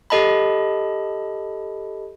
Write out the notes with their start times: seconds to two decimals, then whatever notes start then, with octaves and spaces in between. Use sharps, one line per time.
0.10 G4 A4 D#5 A5 B5